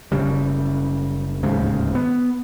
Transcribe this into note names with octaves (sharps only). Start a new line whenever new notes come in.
F#1 C#3 G3
D1 D#2 G#2 C#3
B3